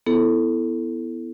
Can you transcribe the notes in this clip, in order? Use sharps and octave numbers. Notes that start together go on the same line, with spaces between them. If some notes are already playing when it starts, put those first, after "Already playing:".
B3 E4 A4